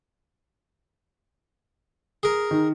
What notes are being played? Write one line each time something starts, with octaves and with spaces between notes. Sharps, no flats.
G#4 A#4
D#3